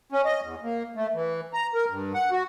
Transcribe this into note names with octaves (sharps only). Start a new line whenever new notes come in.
C#4
D#5
E2
A#3
A3
E3
A#5
A#4
G2
F#5
F#4